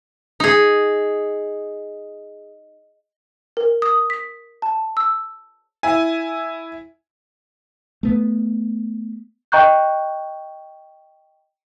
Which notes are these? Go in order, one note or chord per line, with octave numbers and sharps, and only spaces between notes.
D#4 G#4
A#4
D#6
B6
A5
E6
E4 G#5
A3 B3
D#5 G5 A#5 C#6 F#6 G6